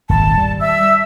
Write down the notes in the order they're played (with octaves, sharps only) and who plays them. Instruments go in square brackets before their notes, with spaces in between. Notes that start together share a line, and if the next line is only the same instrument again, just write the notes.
[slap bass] D#1 G#1 [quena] A5
[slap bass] G3
[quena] E5 [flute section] E6